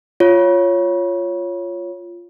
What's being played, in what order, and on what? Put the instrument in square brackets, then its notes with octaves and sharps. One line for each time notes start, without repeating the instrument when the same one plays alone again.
[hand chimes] F4 C#5